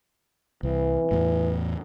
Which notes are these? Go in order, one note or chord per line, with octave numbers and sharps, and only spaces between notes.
C2 E3
E2 A2